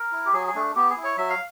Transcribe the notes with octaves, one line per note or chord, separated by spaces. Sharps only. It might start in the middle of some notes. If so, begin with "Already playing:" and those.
Already playing: A#4
E4
G4
F#3 G#4
G#4
A3 D4
B3 G4
G#4
E4
C#5
F#3 E5
F5